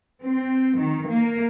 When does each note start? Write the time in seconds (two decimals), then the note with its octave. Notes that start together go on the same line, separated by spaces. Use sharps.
0.21 C4
0.78 D#3
1.08 A#3